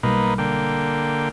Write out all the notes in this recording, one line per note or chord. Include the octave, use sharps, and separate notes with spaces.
B1 B2 G3 A#3 D#4 B4
D3 A#3 G5